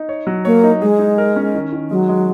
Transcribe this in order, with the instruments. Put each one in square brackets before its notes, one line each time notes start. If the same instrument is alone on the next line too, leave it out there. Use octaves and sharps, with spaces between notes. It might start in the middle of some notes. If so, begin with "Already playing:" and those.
Already playing: [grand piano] D#4
C#5
F#3
[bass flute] A#3 [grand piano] C#5
[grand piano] D#4
[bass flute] G#3 [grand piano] G#4
[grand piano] D#4
A#4
C#4
D#3
D#3
[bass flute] F#3 [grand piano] G#3
[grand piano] G#3